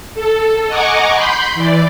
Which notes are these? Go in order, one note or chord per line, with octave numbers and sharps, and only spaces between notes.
A4
D#5 F#5 G#5 A#5 C#6 D6
B5 C6 G6
E3 D5